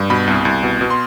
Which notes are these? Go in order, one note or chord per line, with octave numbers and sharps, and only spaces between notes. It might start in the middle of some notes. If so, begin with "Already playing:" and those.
Already playing: G2
B2 B5
C2
C2
B2
B2
C6